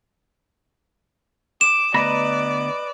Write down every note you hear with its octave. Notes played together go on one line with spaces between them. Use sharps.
D6 E7
D2 B3 B4 D5 D#5 A#5 B5